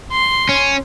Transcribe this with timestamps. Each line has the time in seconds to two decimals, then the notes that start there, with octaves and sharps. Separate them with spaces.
0.11 C6
0.49 C#4